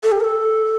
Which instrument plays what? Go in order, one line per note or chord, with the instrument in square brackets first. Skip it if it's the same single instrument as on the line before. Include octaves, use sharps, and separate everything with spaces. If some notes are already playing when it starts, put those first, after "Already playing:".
[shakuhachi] A4
G4
A#4
A4